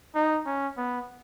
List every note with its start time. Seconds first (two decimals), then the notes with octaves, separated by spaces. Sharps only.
0.15 D#4
0.46 C#4
0.77 B3